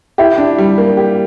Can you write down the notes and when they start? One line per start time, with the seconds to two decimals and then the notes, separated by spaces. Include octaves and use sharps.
0.18 E4 G4
0.38 D4
0.58 G3
0.78 A#3
0.97 G4